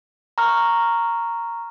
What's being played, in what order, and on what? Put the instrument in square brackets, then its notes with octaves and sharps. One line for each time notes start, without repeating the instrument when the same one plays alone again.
[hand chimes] A#5 C#6 F6